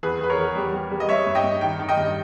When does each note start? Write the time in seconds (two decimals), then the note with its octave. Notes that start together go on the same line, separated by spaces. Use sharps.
0.03 E2 G#4 B4
0.20 E2 B4
0.30 A#4 C#5
0.38 E2
0.56 G3
0.73 G3
0.91 G3
1.00 D#5
1.09 G3 C#5 E5
1.27 G2
1.35 D#5 G5
1.44 G2
1.61 D#3 G5
1.79 D#3
1.89 D#5 G5
1.97 G2